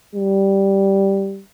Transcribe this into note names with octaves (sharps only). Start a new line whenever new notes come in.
G3